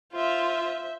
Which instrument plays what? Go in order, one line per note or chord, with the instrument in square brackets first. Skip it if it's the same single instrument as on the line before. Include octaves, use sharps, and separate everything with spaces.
[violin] F4 [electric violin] C5 E5